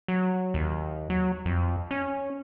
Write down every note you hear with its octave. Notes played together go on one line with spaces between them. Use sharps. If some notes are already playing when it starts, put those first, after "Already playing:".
F#3
D#2
F#3
F2
C#4